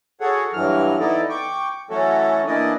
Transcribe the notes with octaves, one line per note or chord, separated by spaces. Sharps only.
F#4 G#4 A4 C#5 F#5
G2 E3 F#3 F6
E3 B3 D#4 E4 A4 D5
G5 C#6 D6
E3 F#3 A3 C#4 F#4 A4
E3 A#3 D4 E4 D5 D#5